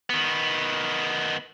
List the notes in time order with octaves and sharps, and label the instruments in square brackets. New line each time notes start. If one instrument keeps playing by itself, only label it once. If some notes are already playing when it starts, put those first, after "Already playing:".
[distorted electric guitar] D#3 B3